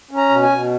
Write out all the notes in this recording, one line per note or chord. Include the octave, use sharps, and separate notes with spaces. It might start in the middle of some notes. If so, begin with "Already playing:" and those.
C#4
A#5
B2
G#5
B2